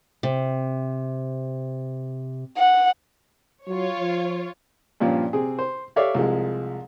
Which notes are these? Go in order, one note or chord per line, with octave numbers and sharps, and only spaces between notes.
C3
F#5
F#3 F4 C#5
F3
G2 A#2 F3 C#4
C3 C4 G#4
C5
G4 A4 C#5 D5 E5 F5
C2 F3 G#3